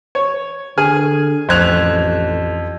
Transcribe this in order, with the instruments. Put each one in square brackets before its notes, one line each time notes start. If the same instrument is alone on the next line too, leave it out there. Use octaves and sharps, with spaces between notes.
[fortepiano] C#5
[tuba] D3 [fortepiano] G#4 G#5 F6
[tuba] A1 [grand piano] F2 G#6 F7 [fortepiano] C5 F#6